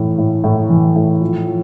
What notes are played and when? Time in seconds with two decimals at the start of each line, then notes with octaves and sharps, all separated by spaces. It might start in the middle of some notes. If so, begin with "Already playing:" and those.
Already playing: A2 E3
0.18 A2
0.44 A2
0.69 E3
0.96 A2
1.21 F3
1.47 F3